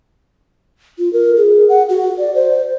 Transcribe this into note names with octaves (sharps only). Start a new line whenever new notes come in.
F4
A#4
G#4
F#5
F#4
D5
C5